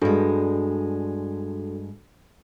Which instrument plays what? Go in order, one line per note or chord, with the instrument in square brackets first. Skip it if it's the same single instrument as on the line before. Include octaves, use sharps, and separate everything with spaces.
[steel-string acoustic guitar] G2 G#3 [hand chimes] D4 F#4 A4